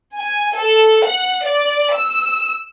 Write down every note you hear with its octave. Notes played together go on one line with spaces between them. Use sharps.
G#5
A4
F#5
D5
E6